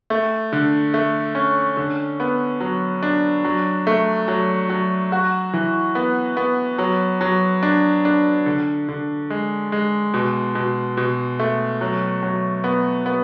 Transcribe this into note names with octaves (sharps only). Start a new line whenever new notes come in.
A3
D3
A3
C#4
D3
B3
F#3
D4
F#3
A3
F#3
F#3
F#4
E3
B3
B3
F#3
F#3
D4
D4
D3
D3
G#3
G#3
B2
B2
B2
A3
F#3
F#3
B3
B3